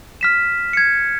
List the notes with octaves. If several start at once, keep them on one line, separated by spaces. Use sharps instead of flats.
F6 B6 E7
G#6 C#7